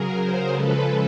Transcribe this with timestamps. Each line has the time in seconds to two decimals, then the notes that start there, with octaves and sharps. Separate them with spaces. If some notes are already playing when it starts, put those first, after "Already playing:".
Already playing: C#3 F#3 G#4 A#4
0.18 A#4 C5
0.54 C#3 F3 G#3 A4 B4